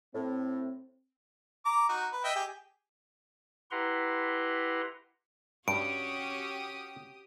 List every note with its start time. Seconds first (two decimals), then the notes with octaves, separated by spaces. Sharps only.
0.14 A2 C4
1.66 A#5 D6
1.89 D#4 F#4
2.12 B4
2.24 D#5 E5 G5
2.35 G4 G#4
3.71 E4 G4 B4 F#5 A#5 C6
5.68 G2 C#4 F#4 G4 D#6 D7